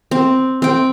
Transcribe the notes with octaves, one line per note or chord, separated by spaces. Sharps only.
C4
C4 G5